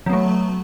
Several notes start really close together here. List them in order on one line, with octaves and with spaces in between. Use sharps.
F#3 B3 A3